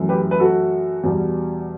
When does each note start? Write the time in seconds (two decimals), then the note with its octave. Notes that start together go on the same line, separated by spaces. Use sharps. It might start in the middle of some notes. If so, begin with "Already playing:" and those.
Already playing: F#2 E3 A3
0.09 G4 B4
0.31 B4
0.40 F#4 A4
1.04 E2 B2 G3